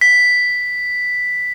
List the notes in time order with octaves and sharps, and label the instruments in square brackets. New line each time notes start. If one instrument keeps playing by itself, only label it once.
[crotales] B6